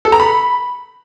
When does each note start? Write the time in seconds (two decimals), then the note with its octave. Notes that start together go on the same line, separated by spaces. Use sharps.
0.05 A4
0.12 A#5
0.20 B5